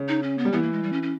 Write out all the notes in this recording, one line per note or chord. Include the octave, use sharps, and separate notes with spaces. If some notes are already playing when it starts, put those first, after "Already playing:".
Already playing: C#3
D#4
C#4
B3
G3
E3 B3
A#3
G#3
G3
C#4
C#4